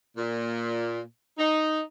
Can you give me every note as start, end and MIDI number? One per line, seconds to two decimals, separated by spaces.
0.17 1.00 46
1.39 1.80 63